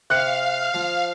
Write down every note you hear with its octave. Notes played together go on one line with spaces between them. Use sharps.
C3 F5 F#6 C#7
F3